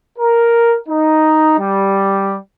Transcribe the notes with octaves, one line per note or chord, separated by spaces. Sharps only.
A#4
D#4
G3